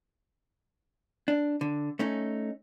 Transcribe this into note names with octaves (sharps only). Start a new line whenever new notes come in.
D4
D3
A3 C#4 D#4